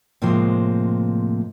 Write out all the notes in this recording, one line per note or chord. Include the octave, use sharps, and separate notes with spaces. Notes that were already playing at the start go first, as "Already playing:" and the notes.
A2 C3 F3 G#3 A#3 C4